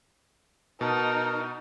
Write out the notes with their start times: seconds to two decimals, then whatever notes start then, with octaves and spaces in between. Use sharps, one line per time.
0.81 B2 D#4 A#4 A5